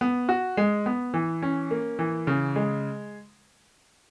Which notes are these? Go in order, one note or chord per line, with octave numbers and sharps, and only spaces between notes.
B3
F#4
G#3
B3
E3
C#4
A#3
E3
C#3
G#3